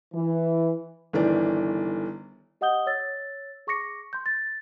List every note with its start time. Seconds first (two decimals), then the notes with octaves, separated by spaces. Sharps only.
0.13 E3
1.13 G1 D#3 E3 D5
2.61 G4 D#5 F#5 D#6 G6 G7
2.87 C#5 E6 A6
3.67 G#4 C#6 D6 A#6 C#7
4.13 C6 G6
4.26 A6